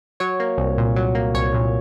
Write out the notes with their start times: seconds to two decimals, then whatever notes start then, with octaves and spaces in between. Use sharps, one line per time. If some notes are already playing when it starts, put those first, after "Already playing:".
0.20 F#3 C#5
0.40 A#3
0.58 C2
0.78 A#2
0.96 F#3
1.15 A#3
1.34 C2 C#5
1.54 A#2